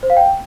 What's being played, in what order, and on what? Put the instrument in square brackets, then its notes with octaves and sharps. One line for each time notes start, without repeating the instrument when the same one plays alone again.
[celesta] C5
F5
G5